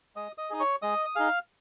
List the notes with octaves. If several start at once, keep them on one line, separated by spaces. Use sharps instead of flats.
G#3 D#5 D#6
D#5 D#6
D#4 G#4 D#6
C#5 C#6
G#3 D#5 D#6
D#6
D#4 G#4 F5 F6